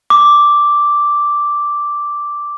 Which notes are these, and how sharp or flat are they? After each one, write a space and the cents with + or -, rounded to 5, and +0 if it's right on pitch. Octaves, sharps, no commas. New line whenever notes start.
D6 -5